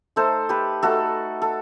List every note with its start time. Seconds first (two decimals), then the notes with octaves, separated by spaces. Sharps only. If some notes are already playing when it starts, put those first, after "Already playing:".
0.16 A3 D#4 A4 C5
0.49 G4 B4
0.83 A3 D#4 F#4 A4
1.42 A4